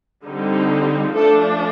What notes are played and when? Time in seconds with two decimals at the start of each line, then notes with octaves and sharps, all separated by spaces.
0.25 D3 G3 C4 D#4
1.14 F3 A3 D4 A4